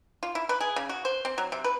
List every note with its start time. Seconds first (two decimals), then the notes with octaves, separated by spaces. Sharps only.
0.23 F4
0.35 E4
0.49 B4
0.60 G#4
0.76 C#3
0.89 F#4
1.05 C5
1.25 C4
1.38 F#3
1.52 C3
1.64 B4